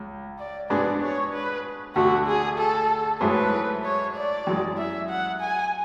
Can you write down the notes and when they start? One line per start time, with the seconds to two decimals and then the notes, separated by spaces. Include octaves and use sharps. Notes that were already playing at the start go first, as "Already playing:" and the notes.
Already playing: C#2
0.39 D5
0.70 G#2 G#3 B3 D4 G#4 D5
1.02 C#5
1.33 B4
1.95 D2 D3 A3 F#4
2.27 G#4
2.58 A4
3.21 G#2 F#3 A3 E4 G#4 B4
3.84 C#5
4.15 D5
4.47 F#2 E3 G#3
4.77 E5
5.09 F#5
5.40 G#5